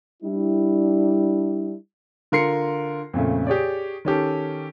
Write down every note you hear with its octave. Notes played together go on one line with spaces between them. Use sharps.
G3 D4 E4
D3 F4 A#4 C6 C7 C#7
F2 A#2 C#3 A3
G4 G#4 C#5 D5
D#3 C#4 G4 A4